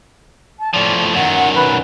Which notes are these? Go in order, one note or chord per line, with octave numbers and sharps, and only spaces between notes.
A5
A2 F3 D5
F#2 D#3 F#5
B4